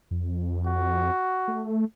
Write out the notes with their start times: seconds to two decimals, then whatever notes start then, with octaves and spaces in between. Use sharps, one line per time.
0.11 F2
0.66 F#4
1.48 A3